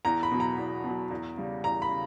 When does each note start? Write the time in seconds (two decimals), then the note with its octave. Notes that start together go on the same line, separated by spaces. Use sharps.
0.05 E2 A#5
0.23 B5
0.31 B2 F#3
0.40 A#5
0.58 E2
0.84 B2 F#3
1.11 E2
1.37 C#3 G3
1.64 E2 A#5
1.82 B5
1.90 C#3